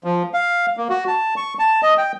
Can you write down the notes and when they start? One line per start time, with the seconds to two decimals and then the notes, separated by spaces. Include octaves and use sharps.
0.04 F3
0.34 F5
0.77 A#3
0.90 F#4
1.08 A5
1.37 C#6
1.59 A5
1.83 D#5
1.98 G5